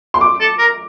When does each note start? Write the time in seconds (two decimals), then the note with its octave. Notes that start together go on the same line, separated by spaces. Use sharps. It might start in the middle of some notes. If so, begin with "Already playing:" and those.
0.14 C6
0.21 D6
0.40 A4
0.59 A#4